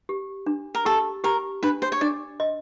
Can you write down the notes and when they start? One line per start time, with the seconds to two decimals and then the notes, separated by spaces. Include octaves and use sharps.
0.09 G4
0.46 D4
0.75 A#4
0.85 G4 A4
1.24 G4 A#4
1.63 D4 B4
1.82 C5
1.92 C#5
2.01 D4 D5
2.40 D#5